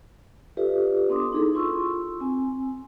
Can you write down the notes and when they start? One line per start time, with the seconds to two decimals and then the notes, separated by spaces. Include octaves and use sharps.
0.57 F4 G4 A4 B4 D5 E5
1.10 B3 D4 C6 D6 D#6
1.32 D#4 E4 G#4 A4
1.55 F4 C6 C#6 E6
2.20 C4 G#5